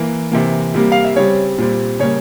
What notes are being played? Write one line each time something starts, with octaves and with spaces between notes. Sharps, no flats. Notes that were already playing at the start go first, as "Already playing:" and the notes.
Already playing: E3 A#3
C3 E3 A#3
C3 G3 A#3
F5
E5
C#3 G3 C4 C#5
A#2 G3 C4
C#3 G3 A#3 C#5